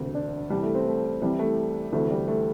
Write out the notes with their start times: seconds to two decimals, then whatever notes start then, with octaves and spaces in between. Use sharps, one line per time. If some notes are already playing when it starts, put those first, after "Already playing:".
Already playing: E1 D2 C3
0.15 D4
0.50 C2 C3 E3 G3
0.63 A3
0.75 C4
0.86 A3
1.21 C2 C3 E3 G3
1.39 A3
1.92 D2 C3 E3 A3
2.11 G3
2.28 A3